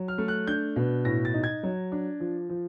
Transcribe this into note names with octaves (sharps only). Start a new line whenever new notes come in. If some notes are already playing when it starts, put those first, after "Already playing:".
Already playing: F#3
F6
A3
F#6
D4 G6
B2
A2 A#6
A6
D#4
G#6
F#3
D4
F3
F3